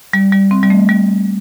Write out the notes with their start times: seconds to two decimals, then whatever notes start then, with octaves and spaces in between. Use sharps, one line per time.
0.13 G3
0.32 G3
0.51 C4
0.63 G3
0.70 A3
0.89 G3